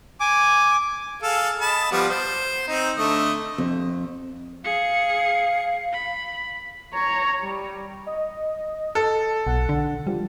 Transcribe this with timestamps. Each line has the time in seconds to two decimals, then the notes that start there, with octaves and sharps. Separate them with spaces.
0.20 G#5 D6
1.22 G#4 A4 F5
1.61 D#5 A5 B5
1.91 F3 G3 B3
2.10 C5
2.68 C4 D#4
2.97 D3 A3 D#5
3.58 F2
4.65 G#4 F5 C#7
5.93 B5
6.94 C#5 A#5
7.42 G3
8.06 D#5
8.95 A4
9.47 B1 F#5
9.69 D3
10.07 F3 G3